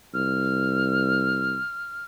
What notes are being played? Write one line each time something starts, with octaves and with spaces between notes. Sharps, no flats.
C2 F6